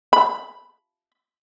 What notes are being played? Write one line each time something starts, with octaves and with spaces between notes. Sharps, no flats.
B5